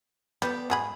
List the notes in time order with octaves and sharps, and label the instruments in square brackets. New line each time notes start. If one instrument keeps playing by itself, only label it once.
[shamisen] G3 [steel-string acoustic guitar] B3 A4 D5
[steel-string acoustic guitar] G#2 [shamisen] F#3 G#4 B5